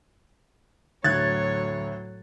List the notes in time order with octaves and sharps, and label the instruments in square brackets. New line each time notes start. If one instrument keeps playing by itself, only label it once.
[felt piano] D2 [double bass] A2 F#3 [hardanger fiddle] C#5 [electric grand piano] F#6 G#6 A6